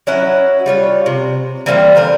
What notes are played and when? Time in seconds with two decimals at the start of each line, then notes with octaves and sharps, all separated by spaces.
0.07 F#3 C#4 E4 F#5
0.66 G3 F4 C#5
1.06 C3
1.66 E3 G3 A#3 C4
1.95 D3 C4 A#4 B4